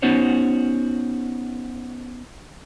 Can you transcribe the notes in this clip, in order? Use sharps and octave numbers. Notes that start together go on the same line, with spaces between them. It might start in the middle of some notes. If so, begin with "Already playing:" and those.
B3 C#4 D#4 F#4 C5 C#5